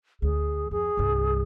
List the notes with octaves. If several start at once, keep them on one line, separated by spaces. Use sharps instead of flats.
D2 G#4
F2 G#4
C2 G2